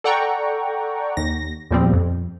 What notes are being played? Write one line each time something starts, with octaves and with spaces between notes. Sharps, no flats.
A4 D5 F#5 G5 A#5 C#6
D#2 A#6
E2 A#2 F3 G3 C4
F2